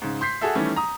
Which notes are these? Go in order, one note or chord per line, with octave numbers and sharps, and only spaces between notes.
G#2 C#3
C6 G6 B6 C7
F#4 G#4 A4 E5
D#3 E3 G3 A3 C#4
A#5 D#6